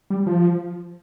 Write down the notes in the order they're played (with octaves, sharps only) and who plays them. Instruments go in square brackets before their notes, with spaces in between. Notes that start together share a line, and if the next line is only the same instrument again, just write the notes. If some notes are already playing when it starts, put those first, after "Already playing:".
[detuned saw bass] G3
F3